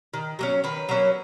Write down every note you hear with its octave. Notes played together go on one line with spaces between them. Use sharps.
D#3
F#3 A#3 C#4
D#3 B4
F#3 A#3 C#4